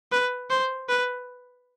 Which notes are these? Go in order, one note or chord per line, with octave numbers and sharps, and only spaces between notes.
B4
C5
B4